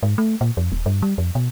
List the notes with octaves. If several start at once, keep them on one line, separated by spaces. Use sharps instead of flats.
G#2
A3
A#2
F2
D#1
G2
G3
F2
B2